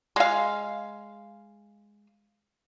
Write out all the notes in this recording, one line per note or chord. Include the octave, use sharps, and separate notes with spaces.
G#3 F5